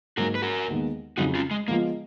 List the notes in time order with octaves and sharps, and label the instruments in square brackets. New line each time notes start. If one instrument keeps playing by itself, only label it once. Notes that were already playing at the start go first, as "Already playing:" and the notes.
[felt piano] G#2 F#3 A#3 [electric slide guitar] F#4 A#4
[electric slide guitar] B4
F#4 A#4
[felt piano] D#2 D#3 G#3 B3
[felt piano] F2 C#3 F#3 [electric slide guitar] D#4 F#4
[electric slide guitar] C#4 F4
G#3
[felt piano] F3 G#3 B3 F4 [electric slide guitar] A#3